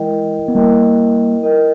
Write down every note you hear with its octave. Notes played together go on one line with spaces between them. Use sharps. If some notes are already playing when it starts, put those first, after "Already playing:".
Already playing: E3 G#3 E4 A#4 D#5 G5
B3
G3 A#3 E4 A#4 D#5 G5
E4 A#4 D#5 G5